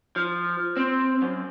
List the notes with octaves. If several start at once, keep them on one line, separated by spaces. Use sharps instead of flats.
F3
C4
F#2